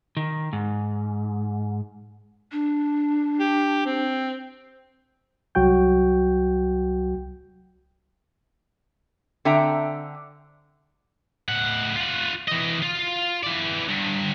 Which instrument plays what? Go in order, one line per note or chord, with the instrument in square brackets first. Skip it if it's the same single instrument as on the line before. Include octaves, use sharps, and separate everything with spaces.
[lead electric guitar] D#3
G#2
[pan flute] D4
[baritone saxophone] G4
C4
[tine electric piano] C2 F#3 F#4 G5 G6
[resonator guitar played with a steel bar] D3 C4 E5 G5 A5 A#5
[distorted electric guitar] A2 F#5
F4 F#5
E3 D#5
F4
E3 D5
G2 D3